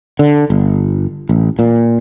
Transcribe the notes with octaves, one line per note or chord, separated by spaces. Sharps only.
D3
G1
A1
A#2